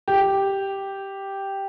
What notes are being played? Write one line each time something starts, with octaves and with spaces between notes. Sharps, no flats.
G4